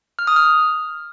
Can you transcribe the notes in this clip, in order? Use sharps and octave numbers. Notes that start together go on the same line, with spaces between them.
F6
D#6
F6